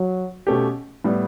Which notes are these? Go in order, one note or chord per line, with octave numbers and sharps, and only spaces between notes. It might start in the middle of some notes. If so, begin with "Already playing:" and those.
Already playing: F#3
B2 A3 C#4 G4
A2 G3 B3